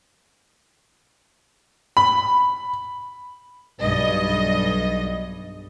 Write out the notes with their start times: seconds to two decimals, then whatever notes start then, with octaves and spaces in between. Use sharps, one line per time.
1.97 B5
3.80 B1 G2 D#5